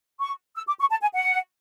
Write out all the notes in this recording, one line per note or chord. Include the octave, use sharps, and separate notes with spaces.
C#6
E6
D6
C#6
A5
G#5
F#5